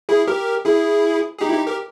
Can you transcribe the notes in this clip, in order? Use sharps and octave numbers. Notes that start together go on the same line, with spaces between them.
E4 G#4
G4 A#4
E4 G#4
G#4
D#4 G4
E4
D#4 G4
G4 A#4